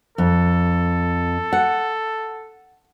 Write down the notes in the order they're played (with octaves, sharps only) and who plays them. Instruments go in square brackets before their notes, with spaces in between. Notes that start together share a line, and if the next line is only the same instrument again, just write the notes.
[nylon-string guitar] F2 [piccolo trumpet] A4
[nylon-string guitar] F#5